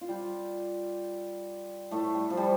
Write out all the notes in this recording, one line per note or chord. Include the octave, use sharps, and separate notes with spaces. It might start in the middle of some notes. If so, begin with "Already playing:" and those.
F4
G3 G4
A2 A3
G3
F3
G3